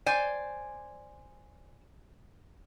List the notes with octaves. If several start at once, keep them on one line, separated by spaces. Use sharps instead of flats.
C5 D5 G#5